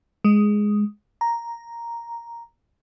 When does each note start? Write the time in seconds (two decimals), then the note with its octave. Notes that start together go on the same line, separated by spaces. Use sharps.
0.24 G#3
1.21 A#5